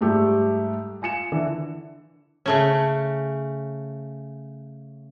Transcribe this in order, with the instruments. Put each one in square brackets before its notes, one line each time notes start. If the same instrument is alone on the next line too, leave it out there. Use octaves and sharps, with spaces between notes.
[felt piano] G#2 G3 A3 G4
F4 G#5 C#7 E7
D3 E3
[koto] C#3 A3 C#4